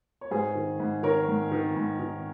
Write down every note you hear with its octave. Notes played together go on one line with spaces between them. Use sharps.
C#5
G#2 G#4 C5
D#3
G#2
D#3 A#4 C#5
G#2
D#3
G#2
D#3